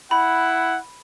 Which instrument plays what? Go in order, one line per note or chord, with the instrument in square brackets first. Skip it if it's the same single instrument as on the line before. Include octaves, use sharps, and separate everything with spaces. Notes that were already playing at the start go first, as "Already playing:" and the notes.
[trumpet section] E4 F#5 [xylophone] B5